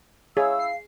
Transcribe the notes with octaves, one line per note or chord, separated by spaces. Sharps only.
E4 G#4 C#5 F5 E6
C7